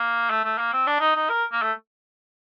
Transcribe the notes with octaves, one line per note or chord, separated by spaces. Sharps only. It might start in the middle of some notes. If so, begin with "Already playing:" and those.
Already playing: A#3
A3
A3
A#3
C4
D4
D#4
D#4
A#4
A#3
A3